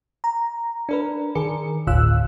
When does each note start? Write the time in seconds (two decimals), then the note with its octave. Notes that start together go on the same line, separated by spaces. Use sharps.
0.24 A#5
0.89 D4 A#4 B4
1.35 D#3 G#4 A#4 C#7
1.87 G1 D2 A2 F4 E6 F#6